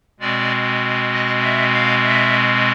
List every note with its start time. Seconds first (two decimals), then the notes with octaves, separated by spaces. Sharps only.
0.20 B2 G#3 C4 D5
1.11 D#5
1.42 E5
1.73 F5
2.03 E5